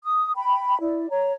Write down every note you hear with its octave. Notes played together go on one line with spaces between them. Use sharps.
D#6
G5 B5
E4 D5
C#5 A#5